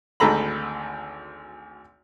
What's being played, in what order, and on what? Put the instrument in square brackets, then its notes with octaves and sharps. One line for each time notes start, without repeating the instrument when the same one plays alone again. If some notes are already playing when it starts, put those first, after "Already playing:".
[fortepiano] G#1 D2 A4 A#5 B5